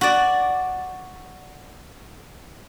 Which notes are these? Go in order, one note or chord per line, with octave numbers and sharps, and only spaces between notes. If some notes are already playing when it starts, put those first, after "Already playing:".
F#4 D5